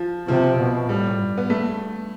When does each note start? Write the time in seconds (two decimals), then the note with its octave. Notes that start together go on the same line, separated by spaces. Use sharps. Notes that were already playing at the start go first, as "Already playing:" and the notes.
Already playing: F3
0.27 C3 F3
0.58 B2
0.88 A2 G3
1.18 G2
1.37 B3
1.50 A3